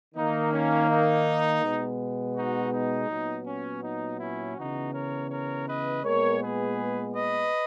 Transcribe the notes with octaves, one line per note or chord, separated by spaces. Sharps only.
D#3 A#3 D#4
C#4
D#4
B2 G#3 B3
D#4 F#4
D#4
A#2 F#3 B3
C#4
D#4
C#4 E4
C#3 E3 B3 D#4 F#4
A#4 C#5
A#4 C#5
B4 D#5
A#2 G#3 B3 A#4 C#5
G#4 B4
B4 D#5